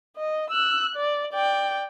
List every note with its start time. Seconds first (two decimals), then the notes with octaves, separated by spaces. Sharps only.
0.17 D#5
0.50 E6 F#6
0.95 D5
1.33 D5 G5